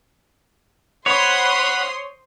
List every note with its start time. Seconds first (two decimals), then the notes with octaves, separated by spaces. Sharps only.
1.06 C5 C#5 F#5 B5 C6 D#6